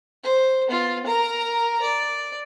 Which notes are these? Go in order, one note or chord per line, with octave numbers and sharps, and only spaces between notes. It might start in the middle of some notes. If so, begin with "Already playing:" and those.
C5
B3 F4
A#4 A#5
D5